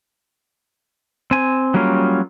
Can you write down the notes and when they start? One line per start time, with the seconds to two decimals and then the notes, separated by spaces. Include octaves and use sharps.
1.31 C4 G#5
1.74 F#3 G3 A#3 C#4 F4